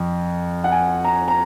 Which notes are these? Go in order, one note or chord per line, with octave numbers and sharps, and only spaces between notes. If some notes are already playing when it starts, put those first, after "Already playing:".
Already playing: F2
F#5
G#5
A#5
A#5